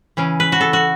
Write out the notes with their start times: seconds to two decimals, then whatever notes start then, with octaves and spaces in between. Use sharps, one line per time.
0.17 C#3 E3 C#4
0.40 B4
0.52 F#4
0.61 A4
0.73 F#4